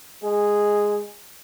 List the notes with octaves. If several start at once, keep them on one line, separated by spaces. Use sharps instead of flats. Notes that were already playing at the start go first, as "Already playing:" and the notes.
G#3 G#4